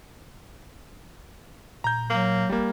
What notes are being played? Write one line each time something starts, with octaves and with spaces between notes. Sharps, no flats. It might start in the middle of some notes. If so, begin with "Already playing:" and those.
A#2 A#5 G6
F#3 A#3
G1 G3 A#3